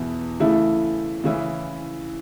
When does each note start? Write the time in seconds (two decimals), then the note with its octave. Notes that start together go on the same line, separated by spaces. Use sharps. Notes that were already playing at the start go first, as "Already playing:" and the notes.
Already playing: E2 B2 B3 E4
0.40 C#3 E3 A3 E4
1.24 C#3 E3 C#4 E4